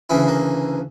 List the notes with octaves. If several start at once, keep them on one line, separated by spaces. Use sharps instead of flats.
D2 C#3 E3 E4
A#3